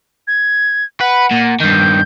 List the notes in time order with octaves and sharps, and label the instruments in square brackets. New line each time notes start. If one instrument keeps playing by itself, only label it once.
[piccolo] G#6
[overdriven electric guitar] B4 [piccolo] F#5
[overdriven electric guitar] A#2
[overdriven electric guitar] G2 D#3 [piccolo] G6